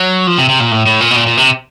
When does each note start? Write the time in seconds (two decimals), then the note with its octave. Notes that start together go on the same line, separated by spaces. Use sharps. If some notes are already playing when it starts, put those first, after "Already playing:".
Already playing: F#3
0.27 F3
0.38 C3
0.49 C3
0.60 A#2
0.71 A2
0.86 A2
1.00 A#2
1.11 B2
1.16 A#2
1.27 A#2
1.37 C3